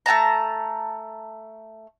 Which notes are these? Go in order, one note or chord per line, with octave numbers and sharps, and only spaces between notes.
A3 A#3 A5 A#5